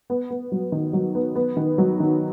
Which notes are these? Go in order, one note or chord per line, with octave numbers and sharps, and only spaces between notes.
B3
B3
F#3
D#3
F#3
B3
B3
D#3
F#3
D#3